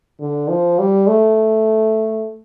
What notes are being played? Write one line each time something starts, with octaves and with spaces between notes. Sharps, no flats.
D3
F3
G3
A3